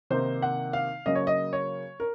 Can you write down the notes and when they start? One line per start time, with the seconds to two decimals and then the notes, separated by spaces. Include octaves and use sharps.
0.10 C3 D#3 A#3 D#4 C5
0.42 F#5
0.73 F5
1.06 C#3 F#3 A#3 C#4 D#5
1.15 C#5
1.27 D#5
1.53 C#5
2.00 A#4